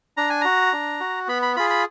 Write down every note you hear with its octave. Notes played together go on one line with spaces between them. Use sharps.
D4 A#5
G#5
F#4 A#5
D4
F#4
B3 B5
B5
F4 G#4 B5
B5